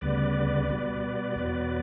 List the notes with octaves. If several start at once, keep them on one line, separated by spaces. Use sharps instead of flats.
D2 C#3 G3 B3 B4 D5
B2 G3 B3
E2 B2 F#3 B3